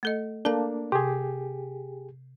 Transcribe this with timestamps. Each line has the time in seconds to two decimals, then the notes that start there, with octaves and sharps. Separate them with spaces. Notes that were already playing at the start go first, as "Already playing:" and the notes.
0.03 A3 A4 D#5
0.45 A#3 D4 A4 F5 A5
0.92 C3 G4 G#4